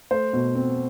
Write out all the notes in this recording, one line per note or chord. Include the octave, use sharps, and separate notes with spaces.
A3 C5
B2
C4